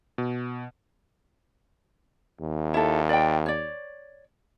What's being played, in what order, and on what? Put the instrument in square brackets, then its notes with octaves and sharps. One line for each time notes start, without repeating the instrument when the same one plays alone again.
[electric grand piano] B2
[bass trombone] D#2
[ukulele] E4 A4
D5 G5
C#5 D5